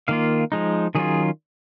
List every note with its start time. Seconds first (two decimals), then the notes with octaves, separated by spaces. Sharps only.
0.08 D#3 A#3 F4 F5
0.52 F3 G#3 D#4
0.95 D#3 F#3 C#4 F4 G#4